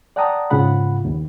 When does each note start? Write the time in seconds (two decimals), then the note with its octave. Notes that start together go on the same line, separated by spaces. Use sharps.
0.16 D5 F#5 G5 A5 A#5 D#6
0.50 G#2 C#3 F4 F#5 B5
1.05 D#2